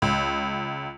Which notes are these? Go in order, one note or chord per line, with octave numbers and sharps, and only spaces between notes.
C#2